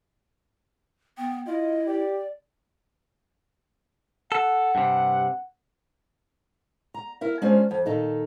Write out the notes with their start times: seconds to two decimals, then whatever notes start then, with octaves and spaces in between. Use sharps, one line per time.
1.18 B3 G5
1.47 E4 F4 D#5
1.87 G4 D5
4.32 A4 F#5
4.75 G2 C3
6.94 A#5
7.21 E4 A#4 E5
7.42 G#3 C#4 D4 F4 C5
7.71 F2
7.86 A#2 D#3 D#4 A4